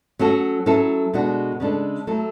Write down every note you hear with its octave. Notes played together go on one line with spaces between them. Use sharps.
F#3 C#4 F#4 A4
F#3 C#4 E4 A4
B2 G#3 D4 F#4
C#3 G#3 D4 A4
F#3 A3 E4 A4